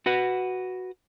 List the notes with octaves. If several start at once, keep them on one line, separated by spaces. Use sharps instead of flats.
F#4 B4 F#5